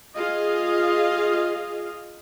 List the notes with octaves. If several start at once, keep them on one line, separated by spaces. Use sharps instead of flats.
F4 G#4 D#5 F5